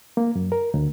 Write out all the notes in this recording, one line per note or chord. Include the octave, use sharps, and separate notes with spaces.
A#3
F#2
A#4
D2